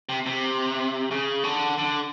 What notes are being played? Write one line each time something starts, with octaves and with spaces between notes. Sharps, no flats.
C3
C3
C#3
D3
D3